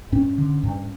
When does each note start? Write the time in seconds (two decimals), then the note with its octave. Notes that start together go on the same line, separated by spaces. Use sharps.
0.12 G2 C#4
0.38 D3
0.63 G2